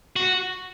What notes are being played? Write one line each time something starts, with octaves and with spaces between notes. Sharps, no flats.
F#4